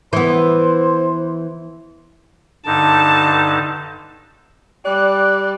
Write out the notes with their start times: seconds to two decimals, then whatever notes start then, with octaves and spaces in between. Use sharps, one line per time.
0.13 E3 B3 C5
2.66 G2 D3 D#4 A5
4.85 G3 D5 F#6